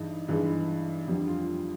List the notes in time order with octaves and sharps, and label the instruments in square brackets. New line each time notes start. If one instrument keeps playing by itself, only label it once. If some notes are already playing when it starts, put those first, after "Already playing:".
Already playing: [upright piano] G2 E3 G#3 D#4
G2 E3 G#3
F2 D3 G3
F4